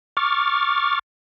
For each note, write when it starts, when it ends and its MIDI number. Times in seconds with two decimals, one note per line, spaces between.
0.17 0.99 85
0.17 0.99 86
0.17 0.99 89
0.17 0.99 93